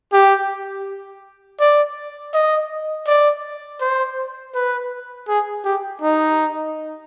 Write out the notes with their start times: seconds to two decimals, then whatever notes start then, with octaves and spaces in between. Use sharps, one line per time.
0.13 G4
1.60 D5
2.34 D#5
3.07 D5
3.81 C5
4.55 B4
5.28 G#4
5.65 G4
6.02 D#4